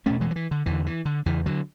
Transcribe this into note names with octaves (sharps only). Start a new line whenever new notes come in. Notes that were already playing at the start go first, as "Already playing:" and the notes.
E2 B2 A3 C#4
E3 G#3
F#3
E3
D3
E2 D3 E3
E3
D3
E2 C#3 E3
D3 F#3